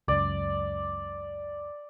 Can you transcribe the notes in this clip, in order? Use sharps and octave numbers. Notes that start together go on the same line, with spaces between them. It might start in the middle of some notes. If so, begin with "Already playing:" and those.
C#2 F#2 D5